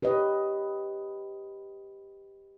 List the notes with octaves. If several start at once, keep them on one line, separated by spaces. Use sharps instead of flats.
G4 B4 C#5 D#5